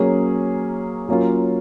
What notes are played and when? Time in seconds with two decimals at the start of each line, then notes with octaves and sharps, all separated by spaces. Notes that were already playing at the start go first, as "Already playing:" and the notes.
Already playing: F#3 A#3 C#4 G#4
1.09 F#3 A#3 C#4 F4